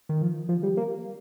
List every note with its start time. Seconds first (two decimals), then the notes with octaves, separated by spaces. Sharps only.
0.09 D#3
0.22 F3
0.49 F3
0.63 G3
0.77 A#3